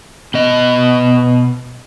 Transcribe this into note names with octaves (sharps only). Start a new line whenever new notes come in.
B2 D#5